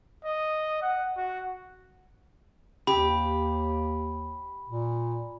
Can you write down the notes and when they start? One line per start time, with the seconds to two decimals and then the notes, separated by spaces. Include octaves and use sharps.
0.24 D#5
0.82 F#5
1.17 F#4
2.87 D#2 G4 B5
4.69 A#2